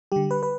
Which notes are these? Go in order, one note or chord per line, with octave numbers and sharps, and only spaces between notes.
D3 G3 G4
B4
B4